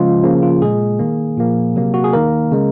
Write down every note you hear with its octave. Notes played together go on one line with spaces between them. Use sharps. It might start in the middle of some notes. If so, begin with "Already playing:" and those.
Already playing: C#3 F3 G#3 F4
C#3 F3 A#3
F4
A#2 G#3 G#4
D#3 A#3
A#2 F3 A#3
C3 F#3 A#3
F#4
G#4
D#3 A#3 A#4
C#3 G#3